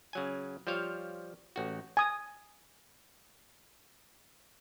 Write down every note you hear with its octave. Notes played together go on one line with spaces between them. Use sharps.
C#3 F#3 G#5
F3 G3 C5 C#5 F5
A1 F#4
G#5 D#6